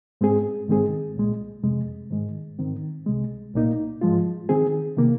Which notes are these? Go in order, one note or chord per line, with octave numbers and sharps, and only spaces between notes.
G#2 G#3 C4 G#4
G#2 D#3 G#3 C4 G#4
C2 A#2 G#3
F2 C3 G#3
G#2 D#3 G#3
G#2 D#3 C4
C2 C3 G#3
C2 A#2 A#3 D#4
G#2 F3 G#3 F4
D#3 C4 G#4
C3 D#3 A#3